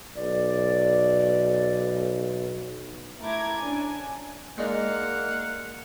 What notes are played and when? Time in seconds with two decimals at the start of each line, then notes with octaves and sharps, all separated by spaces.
0.17 B1 D5
3.21 A3 E4 A#5 D6 G#6
3.63 C#4 D4 G#5
4.58 G#3 A#3 D4 D#4 F5 F#5